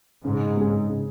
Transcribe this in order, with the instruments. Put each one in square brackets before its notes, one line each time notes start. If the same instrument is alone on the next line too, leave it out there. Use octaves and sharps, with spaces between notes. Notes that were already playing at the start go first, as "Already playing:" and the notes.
[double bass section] G#2 [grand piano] C#3
[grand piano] G#3 C#4 G#4
C#3